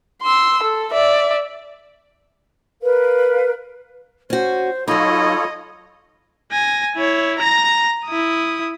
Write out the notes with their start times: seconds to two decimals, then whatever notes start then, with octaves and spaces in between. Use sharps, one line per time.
0.22 C6 E6
0.63 A4
0.92 D5 E5
2.81 A#4 B4 F5
4.30 C#4 F#4 C5
4.88 F#3 D#4 F4 A4 C#5 D#5 B5
6.51 G#5 A#6
6.96 E4 C#5
7.39 A#5 A#6
8.06 E4 D#6